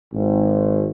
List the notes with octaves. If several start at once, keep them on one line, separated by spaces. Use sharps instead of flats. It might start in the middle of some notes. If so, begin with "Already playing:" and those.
G#1